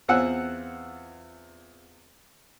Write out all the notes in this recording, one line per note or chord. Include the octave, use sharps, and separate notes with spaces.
E2 C4 F4 F#5 G#5 E6